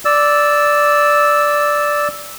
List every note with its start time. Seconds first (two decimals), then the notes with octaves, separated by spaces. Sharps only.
0.05 D5 E6